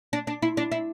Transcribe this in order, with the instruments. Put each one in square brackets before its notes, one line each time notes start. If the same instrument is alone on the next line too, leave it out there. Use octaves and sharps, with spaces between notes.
[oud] D4
D4
E4
D4
E4